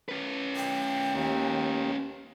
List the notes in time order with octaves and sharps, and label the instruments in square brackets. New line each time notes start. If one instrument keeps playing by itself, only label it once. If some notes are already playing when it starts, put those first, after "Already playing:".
[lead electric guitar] C#4 B4
[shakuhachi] G5
[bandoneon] D#2